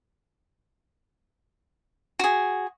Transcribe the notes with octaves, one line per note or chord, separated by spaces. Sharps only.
F#4 G#4